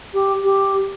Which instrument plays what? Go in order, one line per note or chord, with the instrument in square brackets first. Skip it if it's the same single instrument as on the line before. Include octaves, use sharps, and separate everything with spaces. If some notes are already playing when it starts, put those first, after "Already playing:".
[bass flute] G4
G4